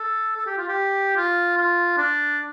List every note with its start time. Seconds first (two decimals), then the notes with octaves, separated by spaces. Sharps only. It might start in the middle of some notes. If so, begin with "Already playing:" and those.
Already playing: A4
0.36 A4
0.46 G4
0.57 F4
0.68 G4
1.16 F4
1.57 F4
1.97 D4